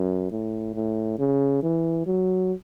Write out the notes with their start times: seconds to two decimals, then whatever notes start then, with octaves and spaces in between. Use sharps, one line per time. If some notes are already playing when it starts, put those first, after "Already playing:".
Already playing: F#2
0.31 A2
0.75 A2
1.19 C#3
1.62 E3
2.06 F#3